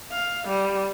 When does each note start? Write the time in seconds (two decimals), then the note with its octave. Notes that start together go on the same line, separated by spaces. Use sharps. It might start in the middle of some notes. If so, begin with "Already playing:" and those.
0.12 F5
0.48 G3